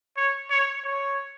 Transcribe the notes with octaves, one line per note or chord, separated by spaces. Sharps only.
C#5
C#5
C#5